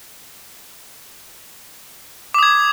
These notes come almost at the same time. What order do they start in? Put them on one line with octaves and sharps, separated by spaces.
D6 D#6 G#6